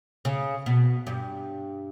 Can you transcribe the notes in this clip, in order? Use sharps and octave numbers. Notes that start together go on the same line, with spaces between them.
C#3
B2
G2